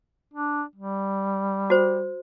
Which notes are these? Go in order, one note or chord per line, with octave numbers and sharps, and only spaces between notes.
D4
G3
F#4 C5